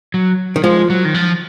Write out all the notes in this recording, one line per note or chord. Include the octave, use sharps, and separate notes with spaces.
F#3
D#3
F3 G#3
F#3
D#3
F3